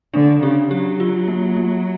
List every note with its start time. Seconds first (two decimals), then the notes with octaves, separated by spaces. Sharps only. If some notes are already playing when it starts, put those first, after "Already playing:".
0.13 D3 D4
0.42 C#3 G4
0.70 F#3 G4
1.00 F4
1.28 A#3
1.56 A#3